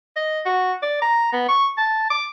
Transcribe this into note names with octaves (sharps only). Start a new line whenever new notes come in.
D#5
F#4
D5
A#5
B3
C#6
A5
D6